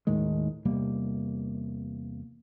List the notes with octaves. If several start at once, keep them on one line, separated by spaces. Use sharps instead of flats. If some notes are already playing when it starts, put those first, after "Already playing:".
D#2 A2 D#3 G#3
E2 C3 G3 A#3